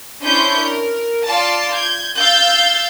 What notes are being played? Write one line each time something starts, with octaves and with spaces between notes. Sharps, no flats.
C#4 D4 E4 C5 C#6 G6
A#4
F4 D5 A5
G6 G#6
F5 E6 G6 A6